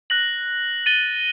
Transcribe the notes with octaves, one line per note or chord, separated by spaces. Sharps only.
F#6 A#6 F#7
A6 D#7 G7